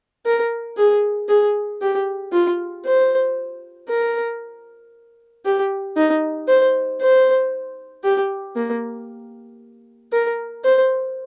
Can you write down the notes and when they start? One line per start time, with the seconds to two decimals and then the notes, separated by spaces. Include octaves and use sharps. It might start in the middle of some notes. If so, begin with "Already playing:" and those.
0.26 A#4
0.77 G#4
1.29 G#4
1.82 G4
2.32 F4
2.85 C5
3.89 A#4
5.45 G4
5.96 D#4
6.48 C5
7.01 C5
8.04 G4
8.56 A#3
10.12 A#4
10.64 C5